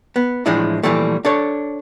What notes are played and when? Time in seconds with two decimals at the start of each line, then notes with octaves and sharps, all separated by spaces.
0.16 B3
0.46 A2 E3 F3 G#3 D4 E4
0.83 A#2 D3 E3 F3 G3 A3
1.25 D4 A4 C#5